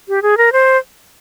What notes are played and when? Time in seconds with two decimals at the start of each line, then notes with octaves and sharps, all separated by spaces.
0.09 G4
0.22 G#4
0.37 A#4
0.52 C5